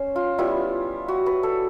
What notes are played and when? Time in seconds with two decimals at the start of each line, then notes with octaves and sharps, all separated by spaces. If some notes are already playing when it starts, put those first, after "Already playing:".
Already playing: C#4 C5
0.16 F4
0.38 G3 B3 E4 F4
1.08 F#4
1.26 B4
1.43 A4